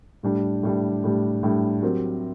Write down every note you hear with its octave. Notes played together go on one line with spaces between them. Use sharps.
A2 G3 D4
A2 G3 D4
A2 G3 D4
A2 G3 D4
F#3 C4 G4 A#4